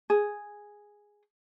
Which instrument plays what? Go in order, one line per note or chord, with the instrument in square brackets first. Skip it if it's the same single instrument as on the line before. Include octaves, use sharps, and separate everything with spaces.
[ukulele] G#4